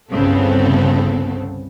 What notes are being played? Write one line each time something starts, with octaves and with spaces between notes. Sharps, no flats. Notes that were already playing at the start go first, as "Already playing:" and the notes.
G1 C2 C#3 B3 C4 A4